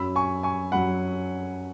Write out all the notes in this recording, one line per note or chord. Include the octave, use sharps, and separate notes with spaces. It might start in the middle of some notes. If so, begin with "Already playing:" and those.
Already playing: F#2 F#3 B5 E6
G#5 C#6
G#5 C#6
F#2 F#3 F#5 B5